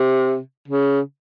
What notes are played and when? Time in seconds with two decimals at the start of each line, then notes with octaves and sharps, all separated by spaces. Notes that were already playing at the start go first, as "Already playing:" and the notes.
Already playing: C3
0.68 C#3